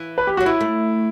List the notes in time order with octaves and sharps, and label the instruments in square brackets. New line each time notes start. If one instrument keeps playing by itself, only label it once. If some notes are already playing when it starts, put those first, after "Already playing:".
Already playing: [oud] E3
[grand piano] B4
G4
[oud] F#3 [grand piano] F#4
[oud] E3 [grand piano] E4
[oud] A3